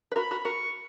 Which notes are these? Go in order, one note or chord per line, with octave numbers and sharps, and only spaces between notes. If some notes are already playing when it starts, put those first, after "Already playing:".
B4
F#4 A#4 B5
F#4 A#4
F#4 A#4 C#6